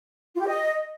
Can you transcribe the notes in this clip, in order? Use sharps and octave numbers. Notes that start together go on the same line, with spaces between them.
F4
G4
D#5